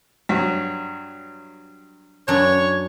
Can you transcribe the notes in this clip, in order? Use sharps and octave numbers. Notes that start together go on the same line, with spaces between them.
G2 F#3
F#2 D4 C#5